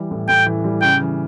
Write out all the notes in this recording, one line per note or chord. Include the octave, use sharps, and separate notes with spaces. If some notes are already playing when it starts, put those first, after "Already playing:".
Already playing: E3 G3
A2
A2 G5
E3
G3
C#3 G5
E3